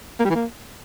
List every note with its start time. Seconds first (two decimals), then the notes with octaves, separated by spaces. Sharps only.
0.20 A#3
0.25 G3
0.30 E3
0.35 A#3